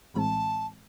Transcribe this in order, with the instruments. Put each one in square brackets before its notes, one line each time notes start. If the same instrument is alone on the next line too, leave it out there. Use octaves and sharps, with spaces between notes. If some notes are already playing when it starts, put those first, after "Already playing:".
[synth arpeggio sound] A#1 A2 E3 G#3 C4 [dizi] A5 B5